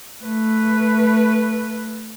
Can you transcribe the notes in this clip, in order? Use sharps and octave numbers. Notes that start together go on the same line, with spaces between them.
A3 B4